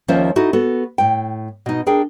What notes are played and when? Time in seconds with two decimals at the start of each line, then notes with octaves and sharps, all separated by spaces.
0.08 D#2 F3 A#3 C#4 C5 E5
0.36 D#4 E4 F#4 A4
0.53 B3 F#4 A4
0.98 A2 G5
1.66 B2 D#4
1.86 D4 G#4 A#4 G5